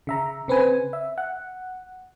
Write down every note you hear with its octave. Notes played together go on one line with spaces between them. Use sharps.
C#3 E5 A#5
C#3 C4 B4 G#5
E5
F#5